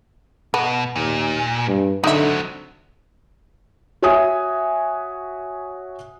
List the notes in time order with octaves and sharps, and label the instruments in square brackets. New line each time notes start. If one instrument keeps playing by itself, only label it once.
[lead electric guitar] B2 [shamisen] B3
[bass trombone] D#2 [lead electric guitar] A#2
[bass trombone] G2
[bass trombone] D3 [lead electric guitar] F#3 C4 [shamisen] D#4 E5
[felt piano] F#4 C#5 E5 G#5 D#6